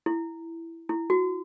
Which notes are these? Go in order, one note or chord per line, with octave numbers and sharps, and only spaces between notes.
E4
E4
F#4